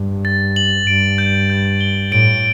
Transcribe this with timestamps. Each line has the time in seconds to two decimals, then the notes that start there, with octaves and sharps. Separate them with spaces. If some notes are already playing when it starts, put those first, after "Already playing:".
Already playing: G2
0.25 A6
0.56 F#7
0.87 G2 D7
1.18 G6
1.50 G6
1.81 G7
2.11 A2 D7